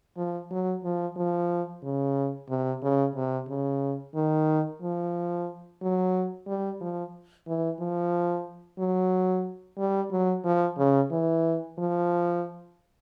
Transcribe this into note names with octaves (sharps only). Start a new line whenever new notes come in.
F3
F#3
F3
F3
C#3
C3
C#3
C3
C#3
D#3
F3
F#3
G3
F3
E3
F3
F#3
G3
F#3
F3
C#3
E3
F3